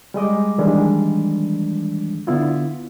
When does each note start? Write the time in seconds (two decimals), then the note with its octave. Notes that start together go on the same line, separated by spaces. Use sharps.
0.14 G3 G#3 D#5 D6
0.58 D#3 E3 G3 G#3 D4
2.27 D3 B3 E4 F4